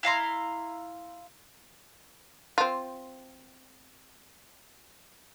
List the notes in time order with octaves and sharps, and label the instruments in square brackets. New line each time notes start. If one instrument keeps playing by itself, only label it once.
[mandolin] E4 F5 A#5 C6
[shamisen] C4 F4